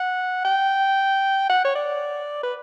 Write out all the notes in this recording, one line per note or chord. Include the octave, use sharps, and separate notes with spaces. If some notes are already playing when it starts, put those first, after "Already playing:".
Already playing: F#5
G5
F#5
C#5
D5
B4